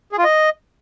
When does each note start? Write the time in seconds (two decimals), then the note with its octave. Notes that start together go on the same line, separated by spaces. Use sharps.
0.12 G#4
0.18 F4
0.24 D#5